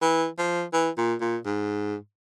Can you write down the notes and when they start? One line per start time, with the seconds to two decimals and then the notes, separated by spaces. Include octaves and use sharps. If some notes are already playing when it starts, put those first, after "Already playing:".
0.02 E3
0.38 F3
0.73 E3
0.98 A#2
1.21 A#2
1.45 G#2